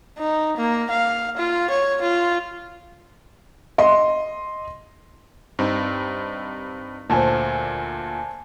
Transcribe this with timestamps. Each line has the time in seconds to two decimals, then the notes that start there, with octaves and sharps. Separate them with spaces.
0.18 D#4
0.57 A#3
0.90 F5
1.37 F4
1.70 C#5
2.01 F4
3.78 D#5 C6
5.59 G2 C4 D#4
7.10 D2 A#2 C5 G#5 A5